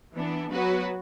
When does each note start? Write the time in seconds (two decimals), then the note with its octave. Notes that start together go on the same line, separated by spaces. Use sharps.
0.14 E3 B3 D4
0.51 F#3 B3 F#4 B4